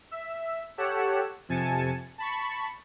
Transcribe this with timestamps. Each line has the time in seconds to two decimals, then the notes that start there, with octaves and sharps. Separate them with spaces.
0.11 E5
0.78 G4 A4 C#5 F#5 E7
1.49 F2 C3 G#5 A5 C#7
2.18 A5 B5 C#6